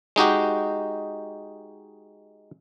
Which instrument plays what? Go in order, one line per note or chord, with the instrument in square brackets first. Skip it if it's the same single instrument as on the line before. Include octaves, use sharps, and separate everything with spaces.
[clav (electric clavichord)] G#3 D#4 F#4 G4